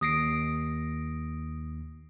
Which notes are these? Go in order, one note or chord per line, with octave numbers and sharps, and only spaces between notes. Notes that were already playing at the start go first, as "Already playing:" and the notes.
D#2 D#6 A#6 C7 D7